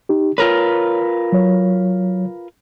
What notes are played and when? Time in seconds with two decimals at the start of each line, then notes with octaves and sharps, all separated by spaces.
0.09 D#4 G4
0.38 F4 A#4 B4 C#5
1.32 F#3 C#5